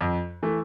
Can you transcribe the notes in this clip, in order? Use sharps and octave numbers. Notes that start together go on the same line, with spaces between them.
F2
E3 A3